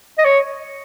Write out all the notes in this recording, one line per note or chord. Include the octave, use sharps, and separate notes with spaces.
D#5
C#5